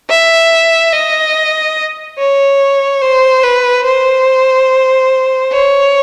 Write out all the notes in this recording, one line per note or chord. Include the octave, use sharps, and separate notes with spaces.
E5
D#5
C#5
C5
B4
C5
C#5